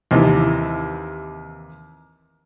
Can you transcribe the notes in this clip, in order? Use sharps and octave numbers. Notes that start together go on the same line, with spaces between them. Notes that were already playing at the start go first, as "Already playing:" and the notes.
D#2 C3 E3